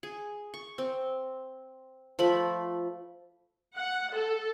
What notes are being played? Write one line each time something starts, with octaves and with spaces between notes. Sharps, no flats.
G#4
C#6
C4
F3 A3 B5
F#5
A4